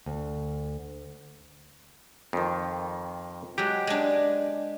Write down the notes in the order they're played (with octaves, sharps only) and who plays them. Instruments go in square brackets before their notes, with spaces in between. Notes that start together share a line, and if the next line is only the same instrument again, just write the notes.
[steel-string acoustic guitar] D2
[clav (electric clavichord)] F2 D#3
[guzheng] F#3 G#3 [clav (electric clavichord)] G4
[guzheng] G#3 D4